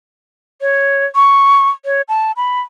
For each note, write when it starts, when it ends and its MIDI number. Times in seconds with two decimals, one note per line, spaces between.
0.61 1.06 73
1.15 1.70 85
1.85 2.02 73
2.08 2.32 81
2.37 2.61 83